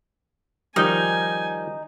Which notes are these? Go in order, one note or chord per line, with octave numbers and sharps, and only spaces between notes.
D#3 F3 G3 D#4 G#5 D#6 G6 G7